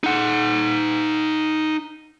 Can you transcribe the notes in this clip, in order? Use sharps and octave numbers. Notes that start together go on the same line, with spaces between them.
D#4 F#5